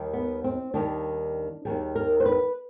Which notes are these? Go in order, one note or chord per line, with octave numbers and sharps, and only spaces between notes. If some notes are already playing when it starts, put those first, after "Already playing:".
Already playing: D#2 D#3 G3
B3
C4
D#2 D#3 G3 D4
D#2 D#3 G3 G#4
A#4
C5
B4